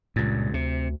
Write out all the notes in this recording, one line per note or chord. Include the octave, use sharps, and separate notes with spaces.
C#2 G2 A#2
D2 C3